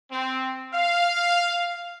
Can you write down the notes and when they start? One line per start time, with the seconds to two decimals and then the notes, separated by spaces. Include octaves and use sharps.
0.12 C4
0.74 F5